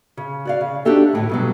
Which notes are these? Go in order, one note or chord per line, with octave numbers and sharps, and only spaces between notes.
C#3
F#4 D5 F5
C#3
D4 D#4 F#4 G4 A4 E5
D2 A2 C#3
G2 B2 F#3